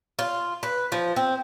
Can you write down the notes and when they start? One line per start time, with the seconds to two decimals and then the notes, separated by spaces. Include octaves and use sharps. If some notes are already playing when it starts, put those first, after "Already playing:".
0.19 F4
0.63 B4
0.92 F3
1.16 C4